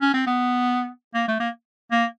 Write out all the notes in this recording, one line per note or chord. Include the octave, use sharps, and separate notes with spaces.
C#4
C4
B3
A#3
A3
A#3
A#3